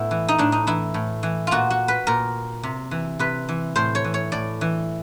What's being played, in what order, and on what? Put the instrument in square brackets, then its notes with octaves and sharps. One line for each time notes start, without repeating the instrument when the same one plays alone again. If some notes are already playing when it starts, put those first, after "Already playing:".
Already playing: [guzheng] A2 B3 E4
E3
D#4
A2 D4
D#4
E3 E4
A2
E3
A#2 F4 F#4
F#4
B4
A#2 A#4
C3
E3
C3 B4
E3
A2 C5
C#5
E3
C#5
A2 D5
E3